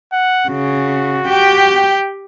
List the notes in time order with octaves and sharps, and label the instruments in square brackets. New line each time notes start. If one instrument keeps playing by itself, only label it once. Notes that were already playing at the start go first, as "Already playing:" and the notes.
[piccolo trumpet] F#5
[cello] C#3 [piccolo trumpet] F#4
[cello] G4 G5